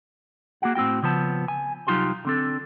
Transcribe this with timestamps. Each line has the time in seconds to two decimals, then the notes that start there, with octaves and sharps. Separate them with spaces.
0.62 A#3 F#4 G#4 F#5
0.75 A2 C4 F4 F#4 G5
1.03 C#3 F3 B3 A5
1.48 G#5
1.87 C2 F#3 D#4 F4 G4 C6
2.25 D3 C4 A4